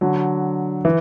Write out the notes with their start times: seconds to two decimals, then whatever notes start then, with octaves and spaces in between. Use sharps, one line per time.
0.01 D3 F#3
0.85 E3